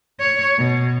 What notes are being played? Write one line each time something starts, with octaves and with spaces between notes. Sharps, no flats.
C#5
B2